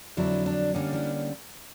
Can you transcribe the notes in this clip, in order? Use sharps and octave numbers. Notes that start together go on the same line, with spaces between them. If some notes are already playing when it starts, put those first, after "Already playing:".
F2 D3 F#3 D4 E4
D4
D3 G3 A#3 C#4 D4
D4 E4